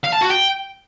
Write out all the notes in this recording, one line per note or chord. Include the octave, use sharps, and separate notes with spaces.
F5
A5
F#4
G5